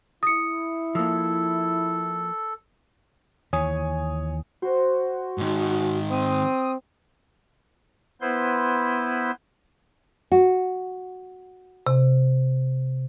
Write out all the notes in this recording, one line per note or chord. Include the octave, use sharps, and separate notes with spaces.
E4 D#6 C#7
F3 A#3 A4
D#2 E3 C#5 G#5 D#6
F#4 C5
G#2 D#3
C4 D#6
B3 E4 B4 C5 C6
F#4
C3